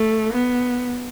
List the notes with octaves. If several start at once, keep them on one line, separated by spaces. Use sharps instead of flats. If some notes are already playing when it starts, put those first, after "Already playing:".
Already playing: A3
B3